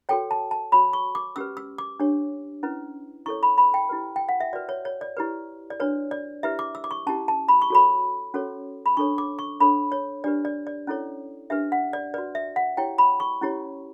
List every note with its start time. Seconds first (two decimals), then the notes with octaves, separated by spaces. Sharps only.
0.09 F#4 A4 C#5 G5
0.31 A5
0.51 A5
0.72 F#4 C#5 B5
0.93 C#6
1.15 D6
1.36 C#4 G4 B4 E6
1.57 E6
1.78 D6
2.00 D4 G4 C#5
2.63 C#4 E4 B4
3.26 E4 A4 C#5 C#6
3.43 B5
3.58 B5
3.74 G5
3.89 E4 G4 B4
4.16 G5
4.29 F#5
4.40 E5
4.53 F#4 B4 D5
4.69 C#5
4.85 C#5
5.01 D5
5.17 E4 G4 B4
5.70 D5
5.80 D4 F#4 B4 C#5
6.11 D5
6.43 E4 G4 B4 E5
6.59 D6
6.75 E6
6.84 D6
6.91 C#6
7.06 C#4 E4 G4 A5
7.28 A5
7.48 B5
7.62 C#6
7.70 F#4 A4 C#5 B5
8.34 C#4 F#4 A4 C#5
8.86 B5
8.97 D4 A4 C#5 C#6
9.18 D6
9.39 C#6
9.60 D4 A4 C#5 B5
9.92 C#5
10.24 D4 G4 B4 D5
10.45 D5
10.67 D5
10.87 C#4 E4 A4 C#5
11.50 D4 G4 B4 E5
11.72 F#5
11.93 D5
12.14 F#4 B4 D5
12.35 E5
12.56 F#5
12.77 E4 G4 C#5 G5
12.98 B5
13.20 C#6
13.41 C#4 E4 G4 C#5